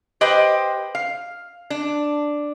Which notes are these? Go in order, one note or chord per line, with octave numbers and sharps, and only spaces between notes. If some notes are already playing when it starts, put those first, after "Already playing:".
G4 B4 C5 D#5 G5
F5
D4